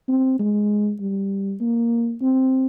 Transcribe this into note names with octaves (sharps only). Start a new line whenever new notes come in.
C4
G#3
G3
A#3
C4